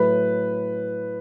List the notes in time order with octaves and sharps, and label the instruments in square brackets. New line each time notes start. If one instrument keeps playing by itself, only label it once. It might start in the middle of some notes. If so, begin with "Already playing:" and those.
Already playing: [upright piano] A2 F#3 B4